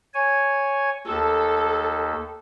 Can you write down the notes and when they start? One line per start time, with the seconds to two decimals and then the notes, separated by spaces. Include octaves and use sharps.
0.14 C#5 G#5
1.07 D#2 A4